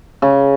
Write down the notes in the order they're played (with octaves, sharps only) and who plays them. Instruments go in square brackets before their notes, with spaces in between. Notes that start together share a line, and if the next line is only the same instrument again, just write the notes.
[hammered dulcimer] C#3